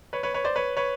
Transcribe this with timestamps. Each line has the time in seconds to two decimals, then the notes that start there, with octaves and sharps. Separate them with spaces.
0.13 B4 C#5
0.23 B4 C#5
0.34 B4 C#5
0.44 C5 D5
0.56 B4 C#5
0.77 B4 C#5